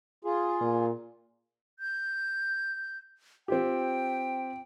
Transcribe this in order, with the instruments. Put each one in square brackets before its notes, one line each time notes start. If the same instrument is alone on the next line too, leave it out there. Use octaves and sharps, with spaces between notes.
[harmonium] F4 G#4
[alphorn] A#2
[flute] G6
[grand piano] C4 F4 G4 [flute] G5